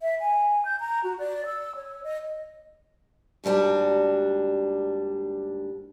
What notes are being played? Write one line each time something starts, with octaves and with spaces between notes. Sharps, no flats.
E5
G#5
G6
A#5
F#4
D5
E6
C#5
D#5
D#2 G#2 G3 D4 F#4